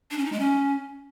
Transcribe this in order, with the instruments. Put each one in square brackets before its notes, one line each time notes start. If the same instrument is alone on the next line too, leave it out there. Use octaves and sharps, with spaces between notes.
[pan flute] D4
C#4
D#4
G#3
C#4